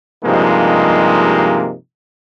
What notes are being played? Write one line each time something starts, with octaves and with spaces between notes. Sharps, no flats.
G2 C3 F3 G#3 A#3 D#4